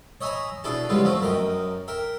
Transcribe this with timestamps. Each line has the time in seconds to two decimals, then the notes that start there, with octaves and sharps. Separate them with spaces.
0.21 C#5 D#5 E5 G#5 A#5 B5
0.64 B2 D4 E4 G#4 A4 A5
0.89 C#3 G3 G#3 B3 E4 F4
1.04 F3 A3 C4 E4 F#4
1.21 F#2 A#4 D#5 G5
1.88 A#4 E5 G5